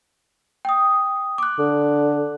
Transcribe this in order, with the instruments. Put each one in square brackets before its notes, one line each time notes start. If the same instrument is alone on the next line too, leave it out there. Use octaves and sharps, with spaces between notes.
[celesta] G5 D#6
D6 F#6
[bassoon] D3